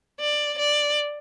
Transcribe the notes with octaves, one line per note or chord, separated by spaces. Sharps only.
D5
D5